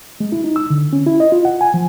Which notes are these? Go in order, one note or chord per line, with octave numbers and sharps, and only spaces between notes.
G#3
E4
D#4
E6
D3
C#4
E4
D#5
F4
F#5
G#5
F3